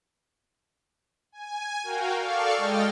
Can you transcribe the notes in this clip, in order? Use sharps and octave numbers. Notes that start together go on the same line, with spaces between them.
G#5
F#4 A#4 F5 G5
A4 D5 F5 C#6
G#3 D#5 G5 F6 A6